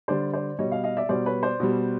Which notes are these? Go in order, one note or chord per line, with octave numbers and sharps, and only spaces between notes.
D3 G3 C5 D5
C5 D5
B2 G3 C#5 D#5
D#5 F5
D#5 F5
D5 E5
B2 G3 C5 D5
B4 C#5
C5 D5
B2 G3